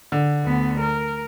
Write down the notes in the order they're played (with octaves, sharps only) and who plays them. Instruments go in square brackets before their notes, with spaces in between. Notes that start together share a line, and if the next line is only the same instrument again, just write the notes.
[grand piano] D3
[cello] D2 B3
A#4